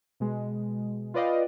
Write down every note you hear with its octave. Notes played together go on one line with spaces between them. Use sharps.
B2 G#3
F4 B4 D5 D#5 F5 G5